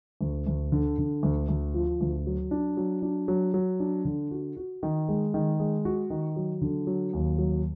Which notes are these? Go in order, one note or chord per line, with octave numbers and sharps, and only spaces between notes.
D2
D2
D3
D3
D2
D2
F3
D2
F#3
D4
F#3
D4
F#3
F#3
D4
D3
F#4
F#4
D#3
G#3
D#3
G#3
F#4
D#3
F#3
D3
F#3
D#2
F#3